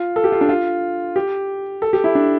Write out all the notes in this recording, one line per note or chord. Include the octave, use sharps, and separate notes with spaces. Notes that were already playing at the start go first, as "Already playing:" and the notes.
Already playing: F4
A4
G4
F4
D4
F4
G4
A4
G4
E4
D4